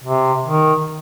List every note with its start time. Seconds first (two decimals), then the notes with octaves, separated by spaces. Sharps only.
0.04 C3
0.45 D#3